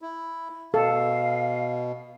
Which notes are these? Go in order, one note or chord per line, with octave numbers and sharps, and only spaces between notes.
E4
B2 A4 F5